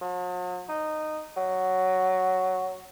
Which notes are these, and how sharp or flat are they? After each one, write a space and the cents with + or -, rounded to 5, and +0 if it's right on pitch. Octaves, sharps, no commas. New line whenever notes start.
F#3 -45
D#4 -15
F#3 +5